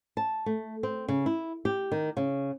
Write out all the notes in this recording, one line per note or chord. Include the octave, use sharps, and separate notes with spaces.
A5
A3
C4
C#3
E4
G4
D#3
C#3